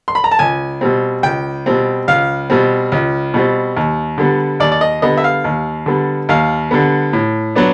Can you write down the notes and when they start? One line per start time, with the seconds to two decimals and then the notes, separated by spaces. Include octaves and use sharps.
0.08 C6
0.15 B5
0.24 A#5
0.31 A5
0.39 C#2 G#5
0.81 B2 G3 C4
1.23 C#2 G5
1.66 B2 G3 C4
2.08 C#2 F5
2.50 B2 G3 C4
2.92 C#2
3.34 B2 G3 C4
3.77 D#2
4.18 D3 G3 B3
4.60 D#2 D5
4.72 D5
4.81 D#5
5.02 D3 G3 B3 D#5
5.17 E5
5.24 F5
5.44 D#2
5.86 D3 G3 B3
6.29 D#2 F5
6.71 D3 G3 B3
7.13 A2
7.56 F#3 B3 D4